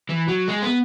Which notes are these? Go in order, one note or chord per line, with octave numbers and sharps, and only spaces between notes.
E3
F#3
G#3
B3